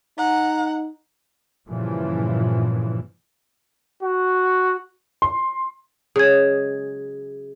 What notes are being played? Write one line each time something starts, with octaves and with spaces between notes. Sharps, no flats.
D#4 F#5 A#5
G2 A#2 C#3 E3 F3
F#4
C6
C#3 F#3 G#3 G#4 G#6